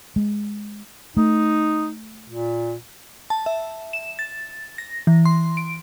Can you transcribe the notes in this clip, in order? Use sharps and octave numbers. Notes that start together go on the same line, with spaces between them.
G#3
A3 D#4
A#2
A5
E5
E7
A6
A#6
E3
C6
D7